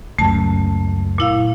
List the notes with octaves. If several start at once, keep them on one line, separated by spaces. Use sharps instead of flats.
C#2 F#2 A3 A5
A#2 E4 F5